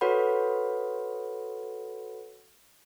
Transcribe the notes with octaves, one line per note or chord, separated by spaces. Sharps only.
F#4 A4 B4 C#5 F#5 B5